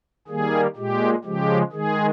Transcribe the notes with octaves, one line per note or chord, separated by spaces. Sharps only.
D#3 G3 A#3 G#4
A#2 G#3 G4
C#3 F3 G#3 G4
D#3 G#3 G#4